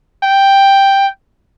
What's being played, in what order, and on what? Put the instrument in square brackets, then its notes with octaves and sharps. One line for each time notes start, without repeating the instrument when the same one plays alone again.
[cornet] G5